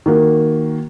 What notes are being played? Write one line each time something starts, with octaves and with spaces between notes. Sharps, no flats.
D#3 A#3 F#4